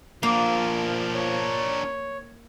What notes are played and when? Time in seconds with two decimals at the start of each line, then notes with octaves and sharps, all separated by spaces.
0.23 A#2 F3 A#3 D4 A#4
1.15 C#5